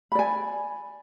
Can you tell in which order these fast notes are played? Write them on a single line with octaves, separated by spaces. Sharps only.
B5 D5 G#5